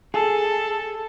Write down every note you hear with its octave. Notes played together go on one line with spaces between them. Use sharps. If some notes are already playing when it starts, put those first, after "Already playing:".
G#4 A4